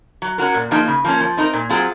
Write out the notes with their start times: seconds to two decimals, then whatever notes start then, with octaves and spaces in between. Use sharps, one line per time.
0.22 F#3
0.38 C#4 F#4 A#4
0.54 A#2
0.71 F3 A#3 D#4 G#4
0.88 C#3
1.04 F3 A#3 C#4
1.20 F3
1.37 C4 D#4 A#4
1.53 A#2
1.69 F#3 C4 F4 G#4